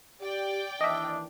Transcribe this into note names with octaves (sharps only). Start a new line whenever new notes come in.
G4 D5 G5
D#2 E3 D4 D#5 E5